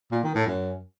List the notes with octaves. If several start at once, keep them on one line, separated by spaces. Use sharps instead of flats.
A#2
D#3
A2
F#2